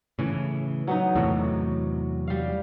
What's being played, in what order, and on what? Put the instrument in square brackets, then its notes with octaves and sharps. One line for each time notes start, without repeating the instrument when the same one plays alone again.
[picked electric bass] A2 C#3 E3
[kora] F#3 B3 D#4
[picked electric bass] E2 C3 F#3 [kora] A2
[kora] G3 F5